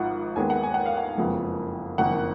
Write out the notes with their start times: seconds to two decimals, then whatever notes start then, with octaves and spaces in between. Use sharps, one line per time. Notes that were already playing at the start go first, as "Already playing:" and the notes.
Already playing: G#1 G#2 F3 F#5
0.36 D#2 D#3 G#3 B3 G#5
0.50 F#5
0.63 G#5
0.74 F#5
0.86 F5
0.97 F#5
1.17 F#1 F2 F3 G#3 B3
1.98 F#1 F2 D#3 F#5